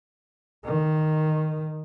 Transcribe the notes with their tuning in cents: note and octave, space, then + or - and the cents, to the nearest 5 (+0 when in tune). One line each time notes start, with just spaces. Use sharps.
D#3 -5